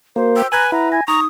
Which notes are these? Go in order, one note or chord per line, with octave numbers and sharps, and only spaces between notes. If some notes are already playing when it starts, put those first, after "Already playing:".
A#3 F#4 A#4 C5
G5 E6
B4 G#5 A#5 F#6 G#6 F#7
E4 F#5 A#5
G#5 A#6
D#4 A#5 C#6 D#6